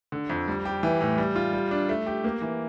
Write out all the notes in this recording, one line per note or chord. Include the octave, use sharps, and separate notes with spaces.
D3
F2
G3
G4
E3
A2
G3
F4
G3
D4
A3
G4
A#3
E3